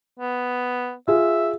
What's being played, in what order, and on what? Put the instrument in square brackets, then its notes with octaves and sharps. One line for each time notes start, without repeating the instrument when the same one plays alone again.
[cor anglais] B3
[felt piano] F4 G#4 [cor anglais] E5